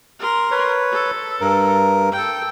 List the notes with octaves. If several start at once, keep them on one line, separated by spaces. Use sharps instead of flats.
A#4 C6
B4 C#5
A4
G2 A#4
A4 G5